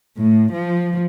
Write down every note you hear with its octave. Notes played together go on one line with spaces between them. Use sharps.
A2
F3